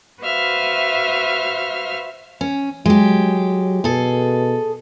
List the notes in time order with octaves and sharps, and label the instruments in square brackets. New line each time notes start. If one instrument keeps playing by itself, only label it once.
[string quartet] F#4 B4 C5 E5 F5 F6
[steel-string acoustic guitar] C#4
[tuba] F#3 [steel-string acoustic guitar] G#3 G4
[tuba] B2 [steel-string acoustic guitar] G#4 A4